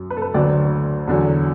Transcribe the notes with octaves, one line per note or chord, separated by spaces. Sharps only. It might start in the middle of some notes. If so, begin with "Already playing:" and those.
Already playing: F#2
B4
A4
B4
D2 D3 F#3 D5
E2 D3 F#3